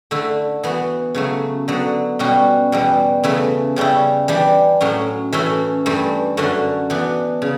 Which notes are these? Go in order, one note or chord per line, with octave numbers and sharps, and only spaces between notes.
D3 A3 E4
E3 B3 F#4
C#3 F#3 A3
D3 F#3 B3
B2 G3 C#4 F#4
E2 B2 G3
C#3 E3 A3 E4
C#3 G3 C#4 E4
E3 G3 D4
A2 F#3 C#4
E3 A3 C#4 E4
G2 E3 A3
F#2 D3 A3 C#4 F#4
E3 B3 D4
C#3